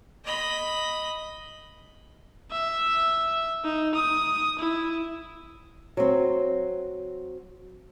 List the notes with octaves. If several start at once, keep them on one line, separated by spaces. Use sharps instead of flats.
D#5 B5
E5
D#4
D#6
E4
F#3 C4